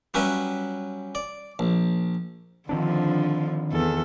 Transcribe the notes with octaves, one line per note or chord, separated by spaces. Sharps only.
F#3 G3 C#4 B4 E5
D5
A#1
D3 D#3 F3 C4 D4
E2 A4